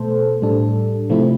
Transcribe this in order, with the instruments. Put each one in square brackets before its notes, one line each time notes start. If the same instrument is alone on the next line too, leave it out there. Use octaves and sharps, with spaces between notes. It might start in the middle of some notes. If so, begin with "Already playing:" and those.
Already playing: [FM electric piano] B2 A3 A4 C5
A2 G3 D4 A4
C3 F3 A3 C4 E4